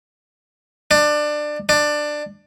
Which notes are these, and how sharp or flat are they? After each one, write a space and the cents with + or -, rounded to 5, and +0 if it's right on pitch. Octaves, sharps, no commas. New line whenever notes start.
D4 +20
D4 +15